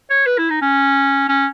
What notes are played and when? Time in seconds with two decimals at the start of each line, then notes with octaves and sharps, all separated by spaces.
0.10 C#5
0.26 B4
0.38 E4
0.50 D#4
0.61 C#4
1.29 C#4